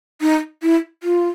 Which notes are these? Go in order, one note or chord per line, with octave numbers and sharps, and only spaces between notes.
D#4
E4
F4